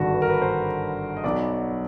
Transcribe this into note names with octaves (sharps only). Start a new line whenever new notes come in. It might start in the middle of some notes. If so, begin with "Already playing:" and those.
Already playing: G#1 G2 D3 F#4
B4
A#4
B4
C5
D#5
B1 B2 F#3 D5